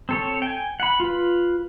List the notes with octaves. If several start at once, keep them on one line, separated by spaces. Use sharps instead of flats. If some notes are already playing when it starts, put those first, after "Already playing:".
C4 A4 C#5
G5 G#5
F#5 B5
F4 B4